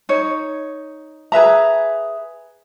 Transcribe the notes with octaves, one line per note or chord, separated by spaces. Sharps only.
D#4 C#5
G#4 B4 E5 A#5